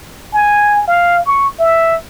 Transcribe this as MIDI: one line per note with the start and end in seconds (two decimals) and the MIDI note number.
0.34 0.85 80
0.87 1.24 77
1.26 1.48 85
1.59 1.96 76